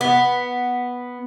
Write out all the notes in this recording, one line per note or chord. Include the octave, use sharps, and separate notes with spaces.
B3